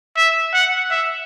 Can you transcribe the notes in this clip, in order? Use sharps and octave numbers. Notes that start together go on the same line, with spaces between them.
E5
F#5
E5